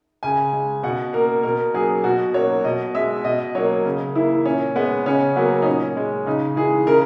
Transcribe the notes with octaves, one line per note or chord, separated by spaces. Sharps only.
C#3 G#5
G#3
B2 F#5
A#3 A#4
B2 A#4
F#3 A#3 G#4
B2 F#4
F#3 A#3 C#5
B2 D#5
G#3 E5
B2 D#5
F#3 A#3 C#5
C#3
E3 A#3 E4
A#2 C#4
G#3 B3
C#3 C#4
F#3 A#3 B3
D#4
A#2 C#4
G#3
C#3 D#4
E3 G#3 G#4
C#3 A#4